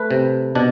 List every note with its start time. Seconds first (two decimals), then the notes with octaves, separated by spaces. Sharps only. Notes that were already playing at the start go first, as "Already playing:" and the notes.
Already playing: A3 B4
0.11 C3
0.55 B2 D4